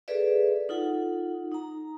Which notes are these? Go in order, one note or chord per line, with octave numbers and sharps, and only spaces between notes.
G#4 A4 B4 D5 E5
D#4 F4 A4 F#5
D#4 A#5